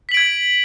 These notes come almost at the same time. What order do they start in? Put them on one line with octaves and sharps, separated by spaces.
B6 F#7 D7 G#6